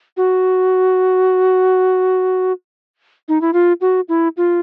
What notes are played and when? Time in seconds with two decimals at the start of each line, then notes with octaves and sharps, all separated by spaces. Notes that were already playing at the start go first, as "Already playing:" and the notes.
0.17 F#4
3.29 D#4
3.41 E4
3.53 F4
3.81 F#4
4.09 E4
4.37 F4